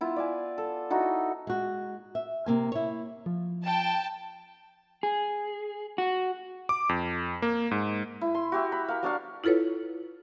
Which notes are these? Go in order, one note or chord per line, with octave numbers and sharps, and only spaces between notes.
B3 E4 F4
D5 F5 G#5
A4
D#4 E4 F#4
G#3 F#4
E5
C3 A#3 G#5
E4 C#5
F3
G5 A5
G#4
F#4
D6
F2
A#3
G#2
E4
C6
F#4 G4 E5
B5
A#4 F5
F#3 D4 C#5 F5
E4 F4 A4 B4 C#5